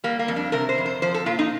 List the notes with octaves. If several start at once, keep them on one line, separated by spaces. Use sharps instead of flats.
G3 A#3
A#3
F2
D4
C3 A#4
C5
F2
C5
F3 C5
A4
A#2 F4
D#4